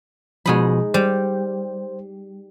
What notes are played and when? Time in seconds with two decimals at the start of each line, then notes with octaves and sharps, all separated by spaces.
0.46 B2 F3 G#3 D#4 B5
0.94 G3 C5